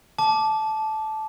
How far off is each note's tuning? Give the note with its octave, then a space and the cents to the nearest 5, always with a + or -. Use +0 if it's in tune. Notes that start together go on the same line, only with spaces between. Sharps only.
A5 -15 D6 +0